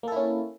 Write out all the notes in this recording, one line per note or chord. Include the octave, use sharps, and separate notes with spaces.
A#3 C#4 E4 A4